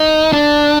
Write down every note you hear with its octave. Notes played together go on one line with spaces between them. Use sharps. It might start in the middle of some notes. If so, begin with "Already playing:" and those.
Already playing: D#4
D4